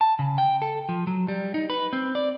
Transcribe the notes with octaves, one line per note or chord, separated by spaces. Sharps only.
A5
C#3
G5
A4
F3
F#3
G3
D#4
B4
C4
D5